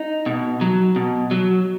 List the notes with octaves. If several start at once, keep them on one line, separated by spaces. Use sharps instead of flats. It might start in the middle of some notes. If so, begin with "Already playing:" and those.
Already playing: D#4
B2
F#3
B2
F#3